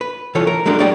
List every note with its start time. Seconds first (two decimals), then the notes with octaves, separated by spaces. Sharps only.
0.01 B4
0.35 C2 E3 F4 A4 C#5
0.47 A#4
0.66 F#3 G#3 A3 D4 A#4
0.79 F#4 G#4 D5 F#5 G5